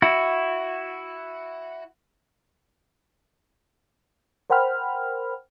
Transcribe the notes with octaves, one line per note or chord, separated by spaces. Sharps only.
E4 F#4
A#4 C5 F#5 G5 B5 F6